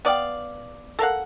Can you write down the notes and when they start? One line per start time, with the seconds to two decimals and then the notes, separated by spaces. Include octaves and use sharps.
0.05 B3 D5 F5 G5
0.99 A4 A#4 F5 F#5